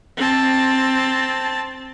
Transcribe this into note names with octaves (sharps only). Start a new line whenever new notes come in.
C4 A5